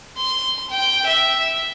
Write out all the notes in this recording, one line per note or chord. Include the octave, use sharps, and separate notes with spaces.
C6
G5
E5